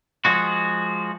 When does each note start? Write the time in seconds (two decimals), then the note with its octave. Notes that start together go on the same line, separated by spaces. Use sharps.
0.25 F3 G#3 F#4